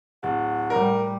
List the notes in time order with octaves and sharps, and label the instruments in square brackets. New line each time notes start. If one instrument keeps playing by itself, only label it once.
[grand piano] D1 [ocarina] F#5
[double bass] A2 G3 [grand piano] A#4